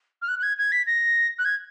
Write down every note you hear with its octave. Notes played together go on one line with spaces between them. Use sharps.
F6
F#6
F#6
G#6
G#6
B6
A#6
F#6
G#6